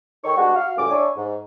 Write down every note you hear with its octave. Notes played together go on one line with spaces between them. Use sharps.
D#3 D#4 A4 G5 C#6
G3 G#3 B3 D4 F#4
F#4 F5
C#2 F#2 A2 G3 G#5 D6
D4 E4 C#5 G#5
G#2